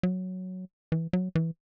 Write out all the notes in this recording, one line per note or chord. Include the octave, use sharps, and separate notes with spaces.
F#3
E3
F#3
E3